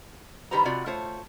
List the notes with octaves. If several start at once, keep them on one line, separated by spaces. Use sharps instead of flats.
D#3 G3 G4 B4 C5 A#5
C3 F4 F#4 D5
A3 F4 C5 C#5